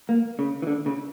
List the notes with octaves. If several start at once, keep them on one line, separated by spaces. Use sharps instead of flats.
A#3
C#3
E3
D3
C#3